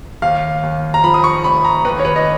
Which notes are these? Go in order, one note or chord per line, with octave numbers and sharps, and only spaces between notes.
D#2 F5
D#2
A#5
F3 B5
D#6
C#6
F1 B5
A#5
D#2 B4
C#5
B4
D#5